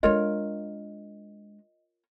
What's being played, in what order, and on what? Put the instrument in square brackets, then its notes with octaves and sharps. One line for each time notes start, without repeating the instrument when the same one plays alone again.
[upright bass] G#3 D4 [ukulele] F4 A#4 C#5 [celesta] D#5